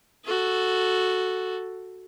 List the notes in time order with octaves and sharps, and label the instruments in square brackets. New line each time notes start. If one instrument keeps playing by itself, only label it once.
[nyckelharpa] F#4 A4